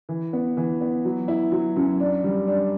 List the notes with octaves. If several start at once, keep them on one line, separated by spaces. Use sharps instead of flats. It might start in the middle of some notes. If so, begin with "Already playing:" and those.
E3
B3
E3
B3
F#3
E4
F#3
F#2
D4
G3
D4